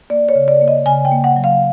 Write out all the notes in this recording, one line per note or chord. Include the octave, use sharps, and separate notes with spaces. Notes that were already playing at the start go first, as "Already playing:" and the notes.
A#3 D5
C#5
C#3
D5
A#3
D#5
C#3 G#5
G5
A#3
F#5
F#3
F5